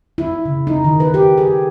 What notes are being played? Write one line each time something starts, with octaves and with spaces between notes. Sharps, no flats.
E4
C#3
D#4
D#3
B4
G4
G#4